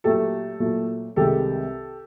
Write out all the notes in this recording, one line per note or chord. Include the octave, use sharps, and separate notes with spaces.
A#2 F#3 A3 G4 A4
A#2 F#3 A3
C2 C3 D#3 G#3 G4 A4